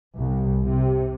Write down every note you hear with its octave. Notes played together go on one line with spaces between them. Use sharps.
C2
C3